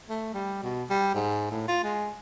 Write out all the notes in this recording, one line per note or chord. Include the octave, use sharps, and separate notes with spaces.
A3
G3
B2
G3
G#2
A2
F4
G#3